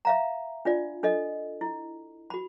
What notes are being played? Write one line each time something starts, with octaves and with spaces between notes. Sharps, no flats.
E5 F5 A#5
D4 F4 D5
D4 A4 D#5
E4
F#4 B5